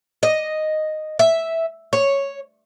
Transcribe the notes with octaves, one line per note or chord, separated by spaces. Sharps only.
D#5
E5
C#5